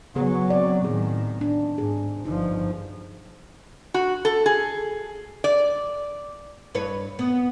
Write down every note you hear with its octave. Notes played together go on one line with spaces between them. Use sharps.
C#3 F#3 B3 G#4
C4 D5
A2 D#3 G#4
D4
G#2 G#4
G1 F3 D#4
F#4
A4
G#4
D5
G2 B4 C#5
B3